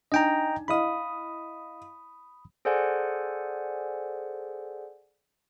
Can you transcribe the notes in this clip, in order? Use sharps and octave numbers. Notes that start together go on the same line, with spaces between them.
D4 D#4 D#5 G5 G#5 A#5
E4 D#5 F5 B5 D#6
G#4 A4 C5 D5 F#5 G#5